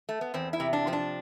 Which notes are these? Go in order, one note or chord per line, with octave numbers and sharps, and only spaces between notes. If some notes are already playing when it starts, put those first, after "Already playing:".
A3
B3
E2 C4
E4
C3
D4
F3 C4
D4